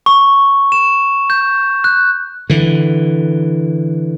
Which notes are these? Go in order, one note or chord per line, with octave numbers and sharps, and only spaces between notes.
C#6
E7
G6
F#6
D3 E3